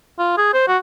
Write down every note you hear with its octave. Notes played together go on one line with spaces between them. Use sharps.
F4
G#4
C5
F#4